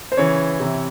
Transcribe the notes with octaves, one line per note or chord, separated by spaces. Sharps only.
C5
C#3 E3 C#5
C3 E3